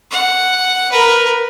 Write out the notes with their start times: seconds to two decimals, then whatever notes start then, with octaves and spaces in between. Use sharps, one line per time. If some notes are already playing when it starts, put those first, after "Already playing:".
0.11 F#5
0.92 A#4 B4